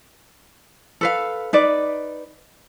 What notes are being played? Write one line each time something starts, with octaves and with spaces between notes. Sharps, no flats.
A4 B4 F5
D#4 B4 D5